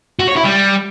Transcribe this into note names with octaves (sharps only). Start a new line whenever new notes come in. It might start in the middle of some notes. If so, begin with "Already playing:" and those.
F#4
C#5
E4
G3